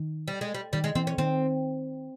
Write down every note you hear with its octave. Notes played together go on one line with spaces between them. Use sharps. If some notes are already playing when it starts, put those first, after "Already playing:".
Already playing: D#3
G3
G#3
G3
D#3 G3
G#3
E3 C4
C#4
D#3 C4